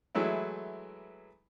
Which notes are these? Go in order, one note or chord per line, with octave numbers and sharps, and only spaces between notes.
E3 F#3 G#3 A3 E4